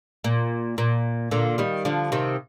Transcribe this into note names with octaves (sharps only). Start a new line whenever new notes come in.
A#2
A#2
A#2 D3
D#3 G3
D3 F3
C3 D#3